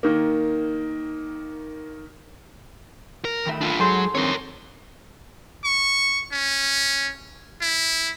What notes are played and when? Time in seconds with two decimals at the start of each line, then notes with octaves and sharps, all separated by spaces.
0.03 D#3 A#3
3.25 A#4
3.46 D#3 A3 E5 B5
3.61 D4 F4
3.79 G#2 F#3 G#4 A4 C6 G6
4.15 G2 D#3 C4 A#4 C#5
5.65 C#6
6.32 C#4
7.61 E4